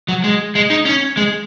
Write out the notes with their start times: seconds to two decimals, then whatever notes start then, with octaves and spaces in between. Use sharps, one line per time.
0.08 F#3
0.24 G#3
0.55 G#3
0.70 D#4
0.85 C#4
1.17 G#3